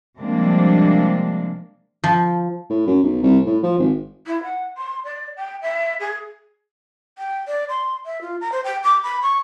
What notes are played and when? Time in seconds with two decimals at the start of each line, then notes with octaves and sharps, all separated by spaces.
0.19 C3 F3 G3 G#3 A#3 D4
2.04 F3
2.70 A2
2.87 F#2
3.04 B1
3.23 C2
3.46 A2
3.63 F3
3.79 G#1
4.26 E4
4.43 F#5
4.77 C6
5.04 D5
5.36 G5
5.62 E5
6.00 G#4
7.18 G5
7.48 D5
7.69 C6
8.06 E5
8.21 F4
8.41 A#5
8.52 C5
8.64 G5
8.84 D6
9.03 B5
9.22 C#6